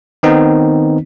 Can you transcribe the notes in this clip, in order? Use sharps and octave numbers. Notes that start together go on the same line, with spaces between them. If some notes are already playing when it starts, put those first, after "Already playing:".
D#3 B3 C4 D#4